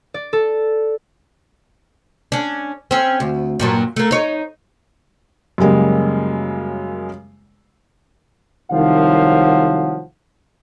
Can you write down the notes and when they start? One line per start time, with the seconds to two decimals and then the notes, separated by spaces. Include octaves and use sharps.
0.14 D5
0.33 A4
2.32 C#4 D4
2.91 C4 C#4
3.20 D2
3.60 G2 A#2 F#3
3.96 A3 A#3
4.11 D#4 C#5
5.58 F#2 C#3 G3 G#3 A#3
8.71 C2 D#3 F3 F#3 F5 F#5